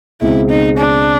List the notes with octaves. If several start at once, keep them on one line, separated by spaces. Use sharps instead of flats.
C#2 B2 G#3 C4 E4
D#4
D4